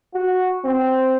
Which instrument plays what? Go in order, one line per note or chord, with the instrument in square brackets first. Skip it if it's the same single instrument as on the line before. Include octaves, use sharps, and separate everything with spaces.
[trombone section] F#4
C4